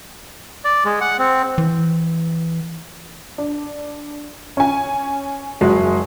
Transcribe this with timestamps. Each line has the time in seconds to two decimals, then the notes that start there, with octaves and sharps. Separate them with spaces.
0.65 D5
0.85 G#3
1.01 F#5
1.19 C4
1.58 E3
3.38 D4
4.57 C#4 G#5
5.61 F#1 F#3 G#3